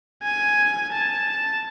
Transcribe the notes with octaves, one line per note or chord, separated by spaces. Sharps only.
G#5
A5